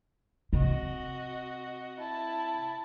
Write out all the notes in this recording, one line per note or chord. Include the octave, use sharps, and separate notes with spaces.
C3 F#4 D#5
E4 A5